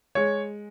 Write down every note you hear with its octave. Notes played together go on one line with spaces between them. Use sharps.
G#3 C#5